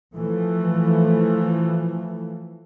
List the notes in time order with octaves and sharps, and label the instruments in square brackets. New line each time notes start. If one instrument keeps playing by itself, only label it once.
[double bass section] E3 F3 A3